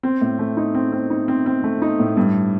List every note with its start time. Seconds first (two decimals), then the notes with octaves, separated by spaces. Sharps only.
0.03 C4
0.21 A2
0.39 A3
0.57 D#4
0.75 C4
0.92 C4
1.10 D#4
1.28 C4
1.46 C4
1.64 A3
1.82 D#4
1.99 A2
2.17 G2